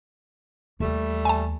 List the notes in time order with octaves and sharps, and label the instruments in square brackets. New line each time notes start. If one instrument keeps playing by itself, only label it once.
[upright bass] D#2 E3 [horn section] G3 A3
[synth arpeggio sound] G#5 A5